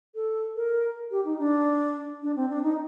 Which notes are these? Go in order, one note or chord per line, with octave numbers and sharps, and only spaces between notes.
A4
A#4
G4
D#4
D4
D4
C4
D4
D#4